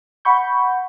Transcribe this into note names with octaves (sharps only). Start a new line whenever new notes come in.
F#5 B5 C#6 G6